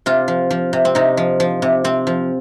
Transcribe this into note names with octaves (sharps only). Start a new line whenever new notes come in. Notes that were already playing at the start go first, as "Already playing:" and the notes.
C3 F4
F3
F3
C3
C4
C3 D#4
F3
F3
C3
C3 C4
F3